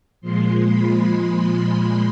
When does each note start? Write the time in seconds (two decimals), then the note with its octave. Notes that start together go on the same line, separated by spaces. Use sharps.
0.21 A#2 F3 G#3 C6
0.65 B5
1.53 B5